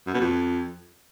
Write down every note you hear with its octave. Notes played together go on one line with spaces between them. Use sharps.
F#2
B2
F2